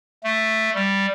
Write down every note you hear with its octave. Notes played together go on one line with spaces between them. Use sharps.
A3
G3